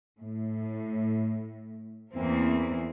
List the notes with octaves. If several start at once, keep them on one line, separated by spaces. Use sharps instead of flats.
A2
E2 E3 A#3 C4